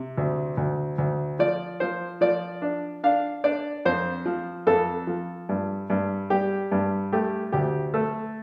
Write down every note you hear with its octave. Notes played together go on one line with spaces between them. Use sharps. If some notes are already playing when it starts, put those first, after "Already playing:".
Already playing: C3
D2
D2
D2
F3 D5
F3 C5
F3 D5
D4
D4 F5
D4 D5
F2 C5
F3
F2 A4
F3
G2
G2
G3 G4
G2
A3 G4
D2 G4
A3 A4